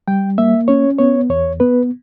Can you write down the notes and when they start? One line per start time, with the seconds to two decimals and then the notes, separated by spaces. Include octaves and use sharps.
0.08 G3 G5
0.38 A#3 E5
0.68 C#4 C#5
0.99 B3 C#5
1.30 E2 C#5
1.60 B3 B4